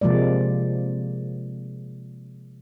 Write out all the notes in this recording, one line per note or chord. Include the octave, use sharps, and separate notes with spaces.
C3 F3 G#3 A#3 D5